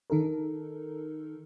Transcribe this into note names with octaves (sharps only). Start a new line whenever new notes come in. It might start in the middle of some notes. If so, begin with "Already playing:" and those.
D#3 D#4 A4 A#4